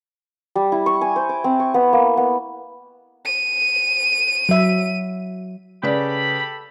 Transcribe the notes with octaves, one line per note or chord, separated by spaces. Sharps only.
G3
E4
C#6
G#5
C5
D6
C4
C#6
B3
A#3
B3
D#7
F#3 E5
C#3 G4 A4 B4 D5 B5